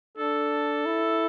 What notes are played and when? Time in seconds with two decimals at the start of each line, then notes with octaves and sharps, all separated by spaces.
0.18 D4 A4
0.85 E4